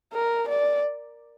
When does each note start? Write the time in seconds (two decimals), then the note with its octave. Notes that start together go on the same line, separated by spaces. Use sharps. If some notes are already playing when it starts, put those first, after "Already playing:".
0.13 A#4
0.48 D5